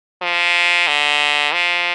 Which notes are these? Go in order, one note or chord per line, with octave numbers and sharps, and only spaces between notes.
F3
D3
F3